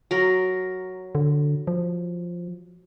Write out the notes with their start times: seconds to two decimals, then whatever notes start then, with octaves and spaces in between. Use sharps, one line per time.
0.11 F#3 A#4
1.15 D3
1.67 F3